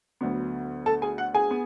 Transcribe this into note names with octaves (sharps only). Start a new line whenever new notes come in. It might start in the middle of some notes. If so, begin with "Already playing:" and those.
D2 D3 F#3 B3
A4 A5
G#4 G#5
F#5
G#4 G#5
B3